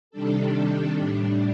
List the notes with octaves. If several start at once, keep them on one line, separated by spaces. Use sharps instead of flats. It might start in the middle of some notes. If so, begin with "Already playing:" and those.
C3 D#3 G3 D4 A4
A2 G3 D4